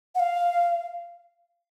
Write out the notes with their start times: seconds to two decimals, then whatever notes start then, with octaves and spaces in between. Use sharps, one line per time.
0.15 F#5
0.20 F5